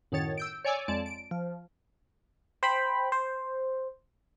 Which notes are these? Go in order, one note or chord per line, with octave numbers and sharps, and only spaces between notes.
F#2 A2 D#3 C#5 A6
E6 G6 D7
C#5 D5 G#5 D6 E6
F2 G#3 D5 A5
D7
F3
C5 G5 B5
C5